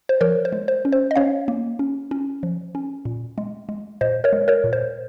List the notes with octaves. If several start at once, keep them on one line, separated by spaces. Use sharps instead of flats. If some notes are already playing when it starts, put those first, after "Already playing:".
C5
F3 A#4 C#5
C5
G#3
C5
C#4
C5
D#5
C#4 C#5 F5
A#3
C#4
C#4
F3
C#4
A#2
G#3
G#3
A#2 C5 D#5
A#4 C#5
G#3
A#4 C#5
A#2
C5